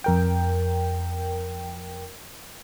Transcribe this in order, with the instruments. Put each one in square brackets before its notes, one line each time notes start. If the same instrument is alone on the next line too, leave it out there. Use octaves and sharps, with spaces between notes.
[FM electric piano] F2 A#4 G5